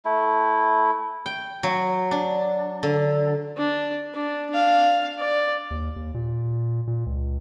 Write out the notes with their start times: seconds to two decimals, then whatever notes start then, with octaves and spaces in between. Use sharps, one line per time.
0.05 A3 E4
1.26 G5
1.63 F#3
2.11 D4
2.83 D3
3.57 D4
4.14 D4
4.50 D4 F5
5.18 D5
5.71 D#2
5.96 D#2
6.14 A#2
6.87 A#2
7.06 C#2